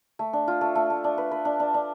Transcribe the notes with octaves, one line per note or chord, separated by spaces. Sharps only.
A3
D4
F4
A3
A3
A3
D4
B4
B4
D4
D4
D4